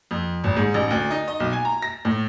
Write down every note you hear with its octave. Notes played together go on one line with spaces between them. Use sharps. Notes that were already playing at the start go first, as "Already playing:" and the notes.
F2
G#1
G#2
A1
D2
D#4
D#5
B1
G#5
A#5
A#6
A2